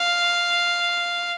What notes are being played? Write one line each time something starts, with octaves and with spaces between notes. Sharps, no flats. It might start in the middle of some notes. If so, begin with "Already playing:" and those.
Already playing: F5